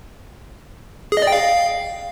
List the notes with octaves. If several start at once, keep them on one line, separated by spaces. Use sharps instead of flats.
G#4
D#5
D5
G5
F5